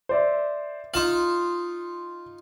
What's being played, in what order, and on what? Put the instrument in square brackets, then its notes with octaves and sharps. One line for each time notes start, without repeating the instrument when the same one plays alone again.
[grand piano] C5 D5 E5
[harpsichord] D#4 F4 F5 [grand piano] E7 F#7